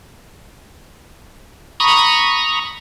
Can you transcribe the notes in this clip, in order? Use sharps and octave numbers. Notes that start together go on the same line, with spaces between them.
A#5 B5 C#6 D#6